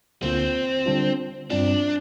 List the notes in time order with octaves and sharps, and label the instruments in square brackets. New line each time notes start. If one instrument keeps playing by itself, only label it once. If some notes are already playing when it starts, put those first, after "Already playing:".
[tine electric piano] D2 D3 A#3 F4 [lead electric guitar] C4
[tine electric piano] D3 G3 D4 F4
[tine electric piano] G2 G3 C4 F4 [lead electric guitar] D4